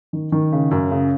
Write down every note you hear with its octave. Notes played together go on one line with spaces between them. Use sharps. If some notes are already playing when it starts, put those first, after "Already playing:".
D#3
D#3
C#3
F#2
C#3